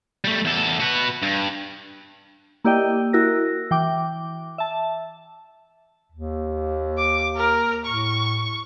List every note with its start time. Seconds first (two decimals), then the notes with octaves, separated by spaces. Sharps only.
0.24 G3 A3
0.45 E2 A4
0.80 F#4 B4
1.22 G2
2.64 A#3 E4 G4 D5 D#5 G5
3.13 E4 F#4 A#4 A#6
3.71 E3 G5 D6
4.58 E5 A5
6.12 D#2
6.98 D6
7.37 A#4
7.86 A2 C#6